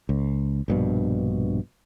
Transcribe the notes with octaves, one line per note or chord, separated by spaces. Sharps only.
C#2
A#1 G2 B2